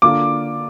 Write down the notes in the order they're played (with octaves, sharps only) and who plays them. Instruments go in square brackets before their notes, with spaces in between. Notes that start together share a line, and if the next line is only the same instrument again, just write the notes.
[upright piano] D3 A#3 D4 F4 [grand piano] D6